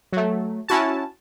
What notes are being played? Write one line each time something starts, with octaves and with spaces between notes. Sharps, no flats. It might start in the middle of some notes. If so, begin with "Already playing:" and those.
F#3 A3
C#4 E4 F#4 A5